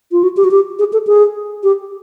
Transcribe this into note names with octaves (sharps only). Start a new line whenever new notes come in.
F4
F#4
G4
F#4
G4
G#4
A4
G#4
G4